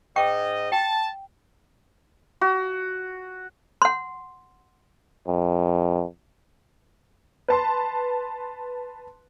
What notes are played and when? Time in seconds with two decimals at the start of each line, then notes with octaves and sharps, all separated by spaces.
0.16 G#2 D#5 G5 D6
0.72 G5 A5
2.41 F#4
3.82 F#5 C6
5.27 F2
7.48 B4 A5 C6